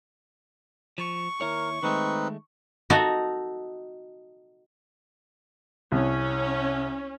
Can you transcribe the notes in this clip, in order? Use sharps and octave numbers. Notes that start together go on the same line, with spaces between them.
F3 C#6
D#2 E4 A#4 C#5
D#3 G#3 A3 C4 D#4 B4
D#4 F#4 A4
C2 C#4